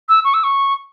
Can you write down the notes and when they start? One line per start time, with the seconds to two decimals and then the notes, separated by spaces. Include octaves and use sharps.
0.09 E6
0.25 C#6
0.34 E6
0.44 C#6